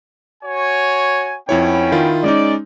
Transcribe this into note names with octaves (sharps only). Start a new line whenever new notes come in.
F#4 C#5 G#5
F2 B3 C#4 E4 C#5 G5
D#3 E4 F4
G#3 C#4 D#4 D5